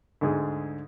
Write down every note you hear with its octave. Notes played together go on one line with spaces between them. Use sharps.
D2 G#2 G#4